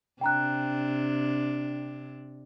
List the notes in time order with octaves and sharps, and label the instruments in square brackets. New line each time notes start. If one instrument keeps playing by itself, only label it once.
[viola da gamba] C3 D4 [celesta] G5 A#5 F#6